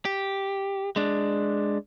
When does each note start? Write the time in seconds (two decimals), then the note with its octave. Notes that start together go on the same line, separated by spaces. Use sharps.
0.05 G4
0.96 G#3 D4